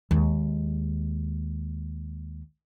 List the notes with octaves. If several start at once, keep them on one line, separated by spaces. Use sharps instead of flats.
D#2 G#3